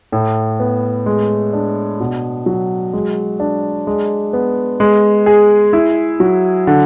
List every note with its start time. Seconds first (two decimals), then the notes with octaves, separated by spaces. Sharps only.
0.12 A2
0.60 B3
1.06 G#3
1.53 D4
2.00 B2
2.46 F#3
2.93 G#3
3.40 D4
3.87 G#3
4.33 B3
4.80 G#3
5.26 G#4
5.73 E4
6.20 F#3
6.67 D3